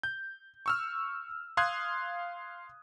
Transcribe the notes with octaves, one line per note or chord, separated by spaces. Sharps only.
G6
C#6 E6 F6
F5 C6 D#6 F#6 G#6